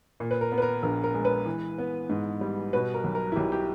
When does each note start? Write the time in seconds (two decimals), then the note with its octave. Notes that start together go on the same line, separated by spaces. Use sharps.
0.20 A#2
0.31 B4
0.41 A#4
0.52 B3
0.58 B4
0.62 A#4
0.83 A#1 A#4
1.04 A#4
1.14 G#3
1.25 B4
1.46 E3
1.78 B3
2.09 G#2
2.41 G3
2.73 B2 B4
2.94 A#4
3.04 B1
3.15 A#4
3.32 E4
3.36 B1 G4
3.52 G4